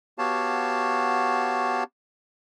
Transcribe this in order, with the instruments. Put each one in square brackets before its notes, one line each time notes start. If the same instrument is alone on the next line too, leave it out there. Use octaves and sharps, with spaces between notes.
[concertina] B3 F#4 G4 C#5 F5 A5